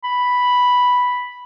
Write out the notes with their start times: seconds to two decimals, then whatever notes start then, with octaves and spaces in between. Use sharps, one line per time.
0.04 B5